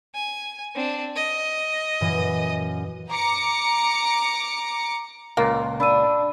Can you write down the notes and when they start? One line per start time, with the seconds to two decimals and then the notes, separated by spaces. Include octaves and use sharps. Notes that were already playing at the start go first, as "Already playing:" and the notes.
0.15 G#5
0.76 C4 D4
1.16 D#5
2.01 F#2 A#2 E3
3.10 A#5 D6 C#7
5.37 C#2 A#2 A#3 F4
5.80 D4 B5 E6 D#7